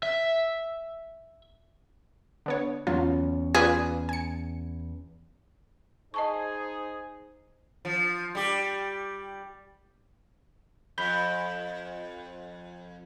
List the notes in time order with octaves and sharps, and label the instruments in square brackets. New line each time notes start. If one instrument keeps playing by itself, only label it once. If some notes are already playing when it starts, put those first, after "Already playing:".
[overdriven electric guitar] E5
[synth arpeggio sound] D3 B3 C#5
[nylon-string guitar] E2 C#4 [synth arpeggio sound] F#3 F4
[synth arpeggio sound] F4 B4 D5 [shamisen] G#4
[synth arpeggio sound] G#5 C#7
[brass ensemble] D#4 G#4 C5 [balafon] D#5 A5 C#6
[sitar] F3
G3 G4
[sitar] F2 [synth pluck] B5 G6